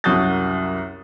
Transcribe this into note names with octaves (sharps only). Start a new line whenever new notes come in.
C2 F#2 F#4 D#6 G6 A6